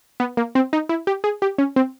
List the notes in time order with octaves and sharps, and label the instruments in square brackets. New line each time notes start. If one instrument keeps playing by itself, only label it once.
[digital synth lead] B3
A#3
C4
D#4
E4
G4
G#4
G4
C#4
C4